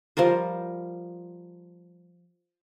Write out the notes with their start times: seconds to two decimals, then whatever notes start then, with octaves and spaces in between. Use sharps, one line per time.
0.17 F3 G3 A#4 C5